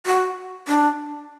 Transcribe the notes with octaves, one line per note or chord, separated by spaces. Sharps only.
F#4
D4